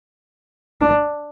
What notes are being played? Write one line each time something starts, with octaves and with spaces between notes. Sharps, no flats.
D4